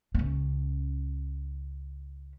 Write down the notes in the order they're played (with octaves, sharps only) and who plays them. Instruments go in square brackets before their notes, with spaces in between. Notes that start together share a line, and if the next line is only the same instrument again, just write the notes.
[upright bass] C#2 C#4